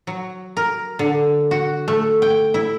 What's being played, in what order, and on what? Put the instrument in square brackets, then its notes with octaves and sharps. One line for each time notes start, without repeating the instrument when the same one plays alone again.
[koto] F#3
A#4
D3
F#4
A3
G5
E4